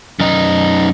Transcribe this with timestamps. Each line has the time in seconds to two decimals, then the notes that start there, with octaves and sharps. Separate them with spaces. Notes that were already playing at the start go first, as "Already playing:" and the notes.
0.20 F#2 D#4